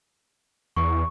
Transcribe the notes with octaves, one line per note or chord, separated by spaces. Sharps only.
E2 C#6